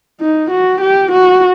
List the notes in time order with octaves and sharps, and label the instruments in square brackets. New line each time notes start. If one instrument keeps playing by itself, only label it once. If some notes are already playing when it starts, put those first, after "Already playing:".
[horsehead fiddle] D#4
F#4
G4
F#4